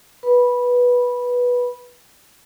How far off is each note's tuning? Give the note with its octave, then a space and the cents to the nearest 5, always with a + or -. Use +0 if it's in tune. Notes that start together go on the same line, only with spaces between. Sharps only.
B4 -10 B5 -15